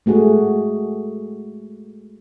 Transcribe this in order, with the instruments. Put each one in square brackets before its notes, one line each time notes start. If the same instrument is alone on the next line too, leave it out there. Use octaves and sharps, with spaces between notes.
[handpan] G#3 A3 F#4 G#4